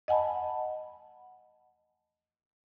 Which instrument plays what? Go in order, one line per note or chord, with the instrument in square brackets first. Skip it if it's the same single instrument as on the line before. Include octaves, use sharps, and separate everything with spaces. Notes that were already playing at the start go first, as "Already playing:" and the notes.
[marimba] D#5 F#5 G#5 A5 B5